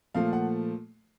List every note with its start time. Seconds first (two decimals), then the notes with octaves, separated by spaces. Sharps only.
0.14 A#2 F3 A3 F5
0.33 F#5